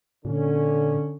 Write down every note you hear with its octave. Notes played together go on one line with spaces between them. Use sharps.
A#2 D3 C#4